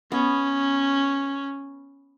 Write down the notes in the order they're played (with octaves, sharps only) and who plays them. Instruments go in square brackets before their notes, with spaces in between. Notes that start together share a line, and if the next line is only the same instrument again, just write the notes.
[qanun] B3 [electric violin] C#4